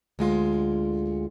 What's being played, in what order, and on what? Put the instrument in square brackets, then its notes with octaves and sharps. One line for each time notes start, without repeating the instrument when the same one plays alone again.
[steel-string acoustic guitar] D2 G#3 F4